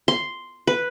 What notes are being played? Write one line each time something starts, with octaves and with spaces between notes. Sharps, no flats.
C6
B4